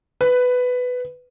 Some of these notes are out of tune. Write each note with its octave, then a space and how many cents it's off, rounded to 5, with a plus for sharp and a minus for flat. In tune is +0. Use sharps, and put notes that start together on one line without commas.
B4 +10